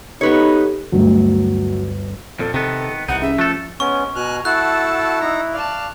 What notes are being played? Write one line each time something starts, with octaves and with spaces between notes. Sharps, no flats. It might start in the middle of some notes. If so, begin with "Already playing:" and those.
B3 D#4 G4 A4 B4 C#5
G1 D2 F#3
F2 A#2 A4
C3 D#3 B3 A4
C2 E3 D#4 F#5
C#4 G#4 E5
F3 A3 A4 F#6
G#3 B3 C#4 C#6
B2 G#5 A#5 F6 F#6
E4 F#4 A4 F#5 A5 E6 F#6
D#4 A#5
D5 F5 A5